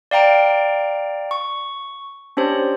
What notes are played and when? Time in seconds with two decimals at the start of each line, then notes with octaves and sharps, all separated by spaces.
0.11 D5 F5 G5 A#5 D7
1.31 C#6
2.37 C#4 D4 G4 C5 C#5